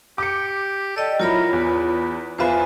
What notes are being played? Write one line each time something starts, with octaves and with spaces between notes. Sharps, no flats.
G4 D6 C#7
A4 D5 D#5 G5
F#3 E4 F4 A#4 C#5 B5
E2 B4
E2 F4 B4 C5 E5 G#5